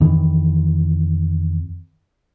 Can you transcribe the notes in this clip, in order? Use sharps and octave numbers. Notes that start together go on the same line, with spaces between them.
F2 D#3 E3